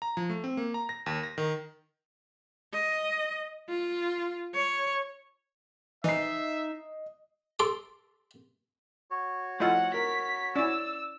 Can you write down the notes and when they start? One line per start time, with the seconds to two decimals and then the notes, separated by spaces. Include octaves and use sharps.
0.02 A#5
0.17 F3
0.30 A3
0.44 C4
0.57 A#3
0.74 A#5
0.89 A#6
1.06 D#2
1.23 A#6
1.38 D#3
2.73 D#5
3.69 F4
4.54 C#5
6.04 E3 D#4 D#5 E5 C7
7.59 A4 C6 D6
9.11 F#4 C#5
9.60 F3 A3 E4 F4 D#5 F#5 E6
9.94 A#4 B6
10.56 C#4 E4 D5 E6